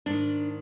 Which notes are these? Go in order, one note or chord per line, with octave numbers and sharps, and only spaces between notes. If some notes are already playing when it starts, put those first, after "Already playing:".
G#2 D#3 D4